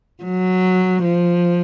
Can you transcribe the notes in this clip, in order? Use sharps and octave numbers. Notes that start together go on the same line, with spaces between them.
F#3
F3